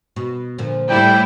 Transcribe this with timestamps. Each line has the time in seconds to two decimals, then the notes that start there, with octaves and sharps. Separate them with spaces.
0.16 B2
0.58 A#2 D3 F3
0.89 A2 G3 E4 G5